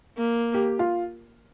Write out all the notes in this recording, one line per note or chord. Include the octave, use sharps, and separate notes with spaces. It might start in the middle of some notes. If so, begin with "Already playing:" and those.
A#3
G4
F4